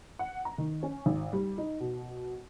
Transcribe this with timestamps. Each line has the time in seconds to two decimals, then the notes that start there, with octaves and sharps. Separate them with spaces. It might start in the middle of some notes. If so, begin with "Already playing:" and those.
0.19 F#5
0.45 A#5
0.58 D#3
0.83 C#4
1.06 G#1
1.33 G3
1.58 D#4
1.80 B2